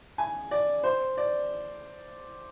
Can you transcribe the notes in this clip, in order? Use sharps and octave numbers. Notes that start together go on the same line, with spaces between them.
G#5
D5
C5
D5